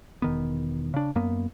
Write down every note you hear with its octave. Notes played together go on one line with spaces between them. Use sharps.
E1 D#3 B3
C#3 D4
F#2 A#3 B3